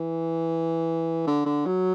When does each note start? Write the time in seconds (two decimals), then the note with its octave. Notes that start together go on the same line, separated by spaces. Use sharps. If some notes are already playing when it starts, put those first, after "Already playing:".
Already playing: E3
1.27 D3
1.46 D3
1.66 F#3